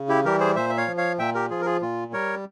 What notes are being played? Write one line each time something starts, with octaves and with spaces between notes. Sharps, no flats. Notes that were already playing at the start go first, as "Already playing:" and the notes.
Already playing: C#3
E4 G4
E3 G3 G4 A#4
G#4 C5
A#2 C5 E5
E5
C#5 F5
F3
C#5 F5
A#2 E5 G5
G4 A#4
F3 F4 G#4
A#4
F4 G#4
A#2 F4
G3 A#4 C#5